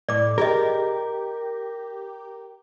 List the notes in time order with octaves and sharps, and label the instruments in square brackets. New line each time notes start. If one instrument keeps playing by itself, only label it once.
[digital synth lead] A2 [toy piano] D5 D6
[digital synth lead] G4 [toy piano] G#4 D#5 [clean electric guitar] A#4